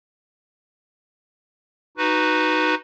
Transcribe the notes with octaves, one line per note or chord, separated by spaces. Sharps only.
D#4 F#4 B4